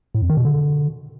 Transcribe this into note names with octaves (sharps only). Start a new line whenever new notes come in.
A2
F2
D#3
B2
D3